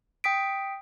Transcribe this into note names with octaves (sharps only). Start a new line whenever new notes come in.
G5 D#6 B6 D7